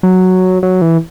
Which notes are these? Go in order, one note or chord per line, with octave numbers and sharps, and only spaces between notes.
F#3
F#3
E3